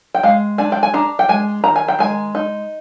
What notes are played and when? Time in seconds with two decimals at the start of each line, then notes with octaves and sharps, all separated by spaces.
0.15 G5
0.23 G#3 F5
0.58 D4 G#5
0.72 G5
0.83 G#5
0.94 D4 A#5
1.19 G5
1.29 G#3 G#5
1.64 D#3 A#5
1.76 G#5
1.88 G5
1.99 G#3 G#5
2.35 D#4